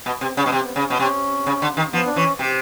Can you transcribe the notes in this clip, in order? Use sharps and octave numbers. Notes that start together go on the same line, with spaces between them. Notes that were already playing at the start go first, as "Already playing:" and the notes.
B2
C3 C4
C#3 C#4
B2
C3 C4
B3
C#3
B2 C#4
C3 C#4
C#3
D3
D#3
F3 B3
D4
E3 C#4
C3 G4